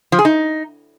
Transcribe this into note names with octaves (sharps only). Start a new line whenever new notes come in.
F3
G#4
D#4